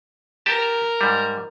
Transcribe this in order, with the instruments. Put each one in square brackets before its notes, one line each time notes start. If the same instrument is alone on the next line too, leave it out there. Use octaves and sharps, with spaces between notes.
[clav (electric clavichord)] G4 A5 [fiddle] A#4
[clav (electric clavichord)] G#2 G3